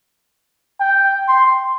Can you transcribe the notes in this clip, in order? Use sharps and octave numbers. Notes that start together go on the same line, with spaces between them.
G5
C6